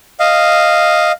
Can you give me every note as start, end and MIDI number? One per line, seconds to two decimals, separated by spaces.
0.20 1.12 75
0.20 1.12 77